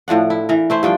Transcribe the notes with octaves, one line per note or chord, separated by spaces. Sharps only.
A2 F3 D4 F#5
E4
E3 A#4
A3 E4 C5
G2 F3 D4 G5